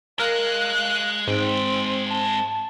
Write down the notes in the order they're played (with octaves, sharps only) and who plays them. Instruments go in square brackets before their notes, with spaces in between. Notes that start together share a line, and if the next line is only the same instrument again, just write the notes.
[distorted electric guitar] G#3 [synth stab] A#4 [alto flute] F5 [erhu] F#6
[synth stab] G#2 [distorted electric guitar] G#3 G5 [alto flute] C4
[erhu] A5